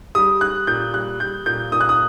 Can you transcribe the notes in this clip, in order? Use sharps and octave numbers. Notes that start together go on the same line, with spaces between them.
G3 D#6
G3 F#6
A#2 G6
G3 F#6
G3 G6
A#2 G6
A#2 D#6
F#6
D#6